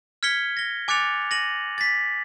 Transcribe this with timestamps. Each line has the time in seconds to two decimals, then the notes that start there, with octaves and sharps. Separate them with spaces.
0.23 F6 G#6 B6 C#7 G7
0.57 A#6 G7
0.88 G#5 D6 F#6 A6 C#7 F7
1.31 A#6 D#7 F#7
1.78 A6 B6